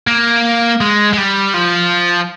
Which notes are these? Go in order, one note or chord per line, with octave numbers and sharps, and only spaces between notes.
A#3
G#3
G#3
G3
F3